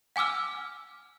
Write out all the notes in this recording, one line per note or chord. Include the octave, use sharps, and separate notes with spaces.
F#5 G#5 D6 E6 F6